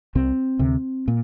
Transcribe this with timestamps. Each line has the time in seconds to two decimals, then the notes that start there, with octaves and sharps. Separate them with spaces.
0.15 C2 C3 C4
0.59 D2 C3
1.08 A#2